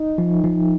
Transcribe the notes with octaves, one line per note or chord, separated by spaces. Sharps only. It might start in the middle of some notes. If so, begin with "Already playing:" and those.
Already playing: D#4
F3
F3